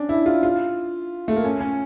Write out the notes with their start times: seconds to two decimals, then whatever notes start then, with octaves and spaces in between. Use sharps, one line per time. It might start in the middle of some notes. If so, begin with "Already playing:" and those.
Already playing: C#4 D4
0.09 E4
0.26 F4
0.43 F4
1.28 A3
1.36 A#3
1.45 C#4
1.61 C#4